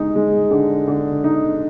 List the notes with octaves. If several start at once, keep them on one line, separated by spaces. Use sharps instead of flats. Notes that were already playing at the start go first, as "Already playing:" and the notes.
Already playing: G#3 D#4
G#3
D3
D3
D#4